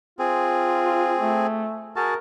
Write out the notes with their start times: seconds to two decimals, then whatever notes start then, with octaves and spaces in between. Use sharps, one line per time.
0.19 C4 F4 G#4
1.18 A3
1.96 F#4 G#4 A#4 A5